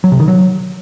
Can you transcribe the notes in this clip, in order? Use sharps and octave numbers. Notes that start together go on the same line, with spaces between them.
F#3
C3
D#3
F#3